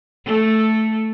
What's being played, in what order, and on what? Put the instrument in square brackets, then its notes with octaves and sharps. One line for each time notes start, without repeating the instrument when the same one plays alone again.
[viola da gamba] A3 A4